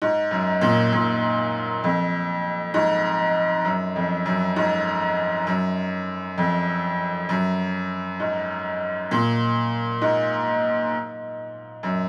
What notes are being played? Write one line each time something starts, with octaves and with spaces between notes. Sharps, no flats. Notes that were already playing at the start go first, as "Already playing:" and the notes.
G#2
F#2
A#2
A#2
F2
G#2
F#2
F2
F#2
G#2
F#2
F2
F#2
G#2
A#2
G#2
F#2